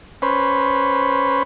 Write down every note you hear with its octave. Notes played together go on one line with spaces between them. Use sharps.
C#4 B4 C5